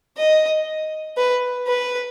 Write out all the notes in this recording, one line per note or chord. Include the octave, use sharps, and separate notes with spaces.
D#5
B4
B4